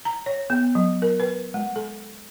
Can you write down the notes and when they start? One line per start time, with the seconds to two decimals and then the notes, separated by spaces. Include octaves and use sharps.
0.05 A#5
0.26 C#5
0.50 B3
0.75 F#3
1.02 A#4
1.20 B4
1.54 G#3
1.76 A4